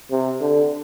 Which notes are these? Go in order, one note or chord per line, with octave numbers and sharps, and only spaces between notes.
C3
D3